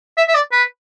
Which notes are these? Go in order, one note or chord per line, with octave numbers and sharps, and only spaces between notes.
E5
E5
D5
B4